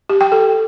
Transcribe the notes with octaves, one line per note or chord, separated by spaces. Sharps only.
G4
G5
A4